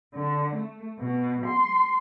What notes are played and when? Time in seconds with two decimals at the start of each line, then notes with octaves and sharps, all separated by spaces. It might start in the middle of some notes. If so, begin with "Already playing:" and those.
0.14 D3
0.55 A3
0.98 B2
1.46 C6